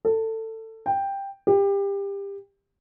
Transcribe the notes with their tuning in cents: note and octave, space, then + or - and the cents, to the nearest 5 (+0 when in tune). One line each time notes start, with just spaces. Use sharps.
A4 +20
G5 +5
G4 +25